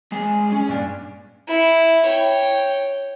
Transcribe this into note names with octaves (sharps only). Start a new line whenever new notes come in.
G#3 G#4 B5
C#4
G2 A#2 D4
E4
C#5 G5